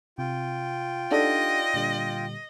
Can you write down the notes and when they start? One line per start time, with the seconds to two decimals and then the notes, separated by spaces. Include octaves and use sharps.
0.18 C3 F4 G5
1.11 D4 D#4 G4 A4 D5 D#5 F#5
1.74 A#2 D3 G3